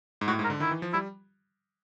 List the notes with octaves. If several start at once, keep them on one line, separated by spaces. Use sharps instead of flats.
G#2
A2 F#4
G#2
A#4
D3
D#3 E4
E3
F3
G3 E4